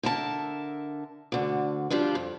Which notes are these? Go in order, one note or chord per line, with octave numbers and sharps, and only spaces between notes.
D3 A#4 E5 A5
D2 D3
F3 G3 D4 F4
F2